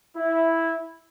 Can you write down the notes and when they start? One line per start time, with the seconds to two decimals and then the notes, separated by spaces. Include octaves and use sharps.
0.16 E4